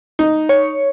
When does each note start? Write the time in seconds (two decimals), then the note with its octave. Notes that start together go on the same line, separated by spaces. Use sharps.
0.19 D#4
0.49 C#5